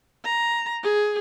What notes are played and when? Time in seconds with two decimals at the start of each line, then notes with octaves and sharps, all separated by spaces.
0.25 A#5
0.83 G#4